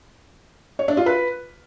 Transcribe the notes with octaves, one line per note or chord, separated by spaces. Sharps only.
C#5
D4
F4
B4